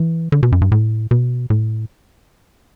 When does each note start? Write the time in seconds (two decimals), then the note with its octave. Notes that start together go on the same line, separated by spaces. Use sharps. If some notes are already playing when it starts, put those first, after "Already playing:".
Already playing: E3
0.32 D3
0.43 B2
0.52 F#2
0.61 G2
0.72 A2
1.11 B2
1.50 A2